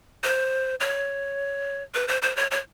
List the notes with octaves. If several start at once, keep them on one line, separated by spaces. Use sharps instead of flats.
C5
C#5
B4
C5
C5
C#5
C#5